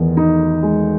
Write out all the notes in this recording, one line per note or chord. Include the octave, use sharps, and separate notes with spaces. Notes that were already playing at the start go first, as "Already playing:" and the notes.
Already playing: E2 D#3
D#4
G#3